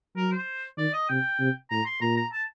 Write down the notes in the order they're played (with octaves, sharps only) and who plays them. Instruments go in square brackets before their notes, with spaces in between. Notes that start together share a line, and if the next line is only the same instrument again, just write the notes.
[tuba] F#3 [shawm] A#4
[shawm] C5
[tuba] D#3 [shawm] D5
[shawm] D#5
[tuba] C3 [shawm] G5
[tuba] C3
[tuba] A2 [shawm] A#5
[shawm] C6
[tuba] A#2 [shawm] A#5
[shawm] A#5
A5